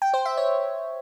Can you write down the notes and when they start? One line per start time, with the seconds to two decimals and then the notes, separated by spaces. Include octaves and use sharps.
0.02 G5
0.14 C5
0.25 E5
0.37 C#5